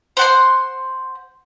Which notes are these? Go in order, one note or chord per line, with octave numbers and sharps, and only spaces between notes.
C5 F#5 C6